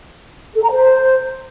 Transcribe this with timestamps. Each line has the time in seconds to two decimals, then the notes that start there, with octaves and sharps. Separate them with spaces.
0.55 A4
0.63 A#5
0.71 C5